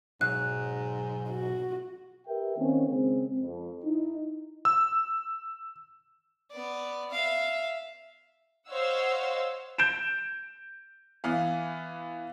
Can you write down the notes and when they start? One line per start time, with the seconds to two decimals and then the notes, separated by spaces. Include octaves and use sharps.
0.21 B1 G#2 F#3 F#6
1.29 F#4
2.28 G4 A#4 B4 E5 G5
2.57 D#3 A#3 C4 C#4 D#4
2.89 C#3 G#3 C4
3.39 F2
3.85 D#4 E4
4.65 E6
6.51 B3 D5
7.10 E5 F5
8.69 C5 C#5 D#5 F5 F#5 E6
9.78 G6 D7 E7
11.24 E3 B3 F5